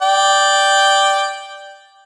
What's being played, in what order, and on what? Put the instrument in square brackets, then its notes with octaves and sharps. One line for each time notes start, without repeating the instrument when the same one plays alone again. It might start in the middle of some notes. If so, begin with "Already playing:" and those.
[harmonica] D5 G5